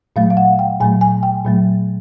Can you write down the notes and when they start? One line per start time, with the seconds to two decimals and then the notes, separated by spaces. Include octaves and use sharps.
0.16 A#2 F#3 A3 F5
0.30 F5
0.37 F#5
0.59 G5
0.80 A#2 F#3 A3 G#5
1.01 G#5
1.23 G5
1.45 A#2 F#3 A3